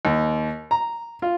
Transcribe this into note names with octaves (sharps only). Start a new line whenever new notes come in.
D#2
A#5
F4